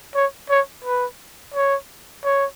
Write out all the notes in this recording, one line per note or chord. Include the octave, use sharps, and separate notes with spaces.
C#5
C#5
B4
C#5
C#5